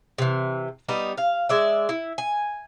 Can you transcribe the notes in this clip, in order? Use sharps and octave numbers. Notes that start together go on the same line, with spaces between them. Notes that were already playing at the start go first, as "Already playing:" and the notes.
C3 E3
G3 B3 D#4
F5
G#3 D5 E5
E4
G#5